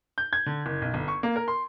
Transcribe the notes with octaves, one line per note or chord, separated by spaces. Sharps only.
G6
G#6
D3
F#1
B1
G1
C#6
A#3
A#4
C6